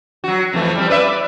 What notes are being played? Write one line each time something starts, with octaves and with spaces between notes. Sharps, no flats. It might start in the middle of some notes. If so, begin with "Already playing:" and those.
F#3 F#4
F2 E3 A3
G3 C4
B4 D5 E5